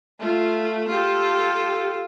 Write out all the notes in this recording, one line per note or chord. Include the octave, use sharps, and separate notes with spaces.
A3 F4
F4 G4 A4